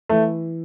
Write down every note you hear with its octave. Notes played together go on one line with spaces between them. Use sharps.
E3 A3